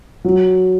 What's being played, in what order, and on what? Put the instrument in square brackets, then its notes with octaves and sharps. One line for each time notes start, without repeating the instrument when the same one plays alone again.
[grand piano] F#3